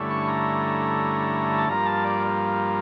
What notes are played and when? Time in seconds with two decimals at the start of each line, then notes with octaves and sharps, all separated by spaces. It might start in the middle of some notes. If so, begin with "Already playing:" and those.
Already playing: G2 D3 A3 C#4 E4
0.10 C#6
0.28 A#5
1.58 A5
1.69 G2 F3 A#3 A#5
1.86 A5
2.04 D5